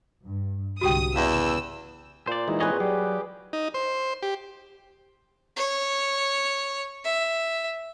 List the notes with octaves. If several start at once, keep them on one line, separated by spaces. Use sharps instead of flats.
G2
C2 G#2 D3 F#4 G4 G5 D#6
E2 C#3 D5 E5 F5 E6
A#2 C5 D5
E3 G#3 D#4
C4 G#4 B4 C#5 D#5
F#3 G3 G4
D#4
C5
G4
C#5
E5